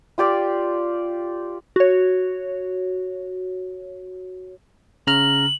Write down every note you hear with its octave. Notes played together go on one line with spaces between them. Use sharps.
F4 G4 D5 F5
F#4 C#5
C#3 A#5 F6 F#7